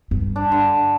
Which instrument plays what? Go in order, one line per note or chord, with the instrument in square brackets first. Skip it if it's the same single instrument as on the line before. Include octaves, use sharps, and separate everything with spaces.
[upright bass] G2
[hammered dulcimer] D4
D3